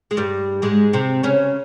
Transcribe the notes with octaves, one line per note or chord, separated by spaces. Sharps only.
G#3
G2 G3
G#2 G#3
C3 C4
C#3 C#4